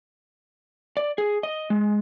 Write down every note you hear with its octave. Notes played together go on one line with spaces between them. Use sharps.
D5
G#4
D#5
G#3